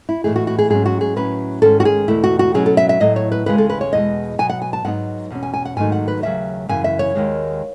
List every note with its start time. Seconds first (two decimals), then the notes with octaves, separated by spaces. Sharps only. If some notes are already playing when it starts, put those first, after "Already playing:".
0.09 E4
0.24 A2 E3 A3 D#4 G#4
0.36 F#4
0.47 F#4
0.59 G#4
0.70 G#2 F#3 C#4 G#4
0.86 F#4
1.01 G#4
1.16 A2 F#3 C#4 B4
1.62 G#2 D#3 G#3 C#4 A4
1.80 F#4
1.85 G#4
2.08 E2 B2 A3 E4
2.24 F#4
2.39 F#4
2.54 B2 F#3 C#4 G#4
2.66 A4
2.77 E5
2.89 E5
3.00 A2 F#3 A3 D#5
3.16 C#5
3.32 B4
3.46 D#2 C#3 G#3 B4
3.58 A4
3.70 B4
3.81 C#5
3.93 E2 B2 G#3 D#5
4.39 B2 F#3 B3 G#5
4.50 F#5
4.62 G#5
4.73 A5
4.85 G#2 F#3 B3 D#4 F#5
5.30 E2 B2 C#4
5.43 G#5
5.54 G#5
5.65 F#5
5.76 G#2 D#3 F#3 A3 D#4 G#5
5.92 F#5
6.08 B4
6.23 D#2 C#3 F#3 E5
6.69 F#2 C#3 E3 G#5
6.84 E5
6.99 C#5
7.15 D#2 D#3 G#3